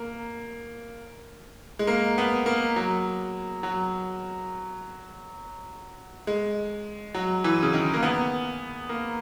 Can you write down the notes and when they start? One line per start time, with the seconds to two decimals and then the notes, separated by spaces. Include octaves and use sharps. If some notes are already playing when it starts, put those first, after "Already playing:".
Already playing: A#3
1.79 G#3
1.87 A#3
2.18 B3
2.46 A#3
2.76 F#3
3.63 F#3
6.27 G#3
7.14 F#3
7.44 E3
7.63 C#3
7.73 D#3
7.94 A#3
8.03 B3
8.89 A#3